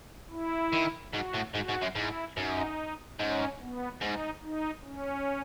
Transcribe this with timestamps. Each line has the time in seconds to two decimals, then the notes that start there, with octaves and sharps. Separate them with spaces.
0.31 E4
0.73 D#3
1.13 G#2 F#4
1.34 A2
1.54 G#2 F#4
1.68 G#2
1.82 F#2
1.95 G#2 E4
2.36 F#2 D#4
3.19 G#2 C#4
3.60 B3
4.02 G#2 D#4
4.42 D#4
4.84 C#4